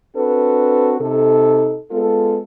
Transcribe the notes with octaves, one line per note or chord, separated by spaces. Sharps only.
C4 D4 F#4 A4 B4
C3 D#4 A4
G#3 B3 F4 A4